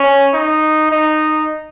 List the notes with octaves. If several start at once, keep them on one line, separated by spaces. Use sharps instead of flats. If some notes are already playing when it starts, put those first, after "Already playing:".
Already playing: C#4
D#4
D#4